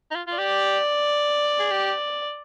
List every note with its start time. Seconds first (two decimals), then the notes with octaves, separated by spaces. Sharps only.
0.11 D#4
0.15 F4
0.27 F4
0.37 G4 D5
1.59 G#4
1.71 G4